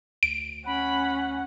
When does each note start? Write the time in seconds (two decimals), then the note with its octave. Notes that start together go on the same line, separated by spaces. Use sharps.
0.23 D2 D7
0.66 C#4 F#5 B5